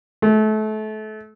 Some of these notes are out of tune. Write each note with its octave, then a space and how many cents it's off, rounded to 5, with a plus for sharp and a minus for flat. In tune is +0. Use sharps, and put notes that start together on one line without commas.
A3 -30